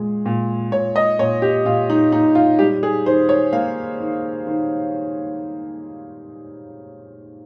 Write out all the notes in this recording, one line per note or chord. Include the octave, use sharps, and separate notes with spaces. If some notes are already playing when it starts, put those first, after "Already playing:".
Already playing: A#2 G#3
A#2
A#2 C#5
D#5
A#2 C#5
G4
A#2 F4
D#4
A#2 D#4
F4
G3 G4
G#4
D#3 C5
C#5
A#3 F5
D#3
D#3